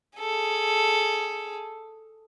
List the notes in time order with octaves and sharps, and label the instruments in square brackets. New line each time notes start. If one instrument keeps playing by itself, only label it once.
[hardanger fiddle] G#4 A4